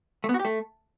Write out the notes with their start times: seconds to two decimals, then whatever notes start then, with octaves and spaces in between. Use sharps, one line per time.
0.24 A3
0.29 B3
0.34 F#4
0.39 G4
0.45 A3